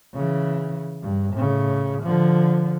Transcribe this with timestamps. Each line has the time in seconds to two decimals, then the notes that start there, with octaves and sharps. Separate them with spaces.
0.15 C#3 E3
1.02 G2
1.34 A2 C#3
2.03 D3 F3